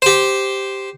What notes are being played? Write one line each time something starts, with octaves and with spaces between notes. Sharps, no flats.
G4 C5